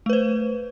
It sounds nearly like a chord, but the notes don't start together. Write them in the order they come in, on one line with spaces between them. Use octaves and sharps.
A3 B4 C5